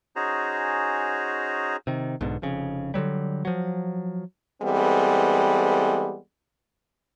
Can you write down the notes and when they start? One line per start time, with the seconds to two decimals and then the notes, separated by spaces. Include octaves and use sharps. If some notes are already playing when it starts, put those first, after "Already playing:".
0.16 C#4 D#4 F#4 G#4 C5 A#5
1.87 C3 D#3
2.21 B1 G#2 B2 D3
2.42 F1 F2 C#3
2.94 D3 D#3 F#3 G3
3.45 F3 F#3
4.62 E3 G3 G#3 B3 C4 A4